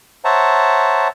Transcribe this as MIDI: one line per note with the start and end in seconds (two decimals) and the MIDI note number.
0.25 1.08 72
0.25 1.08 73
0.25 1.08 76
0.25 1.08 78
0.25 1.08 81
0.25 1.08 82